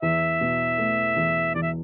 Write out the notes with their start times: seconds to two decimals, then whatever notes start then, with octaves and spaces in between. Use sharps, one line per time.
0.02 E2 E5
0.41 B2
0.78 A3
1.16 E2
1.55 E2 D5
1.63 E5